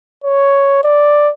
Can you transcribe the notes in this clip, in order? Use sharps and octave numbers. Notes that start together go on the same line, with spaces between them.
C#5
D5